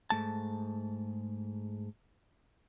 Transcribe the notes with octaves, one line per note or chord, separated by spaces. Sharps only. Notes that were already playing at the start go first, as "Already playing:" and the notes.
G#2 A3 A5